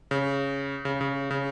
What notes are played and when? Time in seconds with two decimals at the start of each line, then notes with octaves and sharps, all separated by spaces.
0.11 C#3
0.85 C#3
1.01 C#3
1.31 C#3